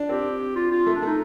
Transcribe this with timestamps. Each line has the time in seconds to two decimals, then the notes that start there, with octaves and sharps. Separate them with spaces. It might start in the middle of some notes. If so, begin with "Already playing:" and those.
Already playing: D4
0.09 C4 G4
0.56 F4
0.71 F4
0.86 A3
0.95 D4
1.02 A3
1.06 D#4